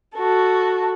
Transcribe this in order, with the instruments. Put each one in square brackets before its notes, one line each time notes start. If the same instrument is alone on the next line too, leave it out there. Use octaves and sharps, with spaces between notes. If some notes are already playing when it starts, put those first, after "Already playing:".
[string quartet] F#4 A4